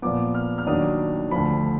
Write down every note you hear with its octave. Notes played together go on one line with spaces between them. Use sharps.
A#2 F3 B3 D6
F6
F6
D#2 D#3 F#3 D4 D#6
D2 D3 F3 B5